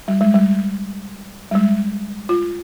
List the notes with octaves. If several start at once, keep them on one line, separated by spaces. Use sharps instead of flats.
G3
G#3
G3
G3
G#3
F4